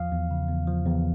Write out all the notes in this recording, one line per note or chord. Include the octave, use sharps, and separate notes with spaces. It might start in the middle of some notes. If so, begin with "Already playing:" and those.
Already playing: E2 F3 F5
E2
C#3
E2
F3
E2